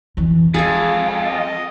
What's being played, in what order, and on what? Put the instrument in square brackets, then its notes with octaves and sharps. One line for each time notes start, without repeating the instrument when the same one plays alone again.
[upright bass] F2 E3
[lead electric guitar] F2 [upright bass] G#3 [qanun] G#4 E5
[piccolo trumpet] D#5